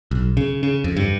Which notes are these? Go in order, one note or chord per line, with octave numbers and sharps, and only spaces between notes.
B1
C#3
C#3
F2
G2